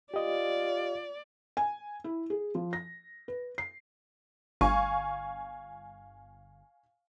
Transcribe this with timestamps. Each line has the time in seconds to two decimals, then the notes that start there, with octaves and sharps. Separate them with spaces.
0.14 F4 G4 D5 D#5
1.57 G#5
2.04 E4
2.30 G#4
2.55 F3
2.73 A#6
3.28 B4
3.58 C7
4.61 G1 F5 G#5 C#6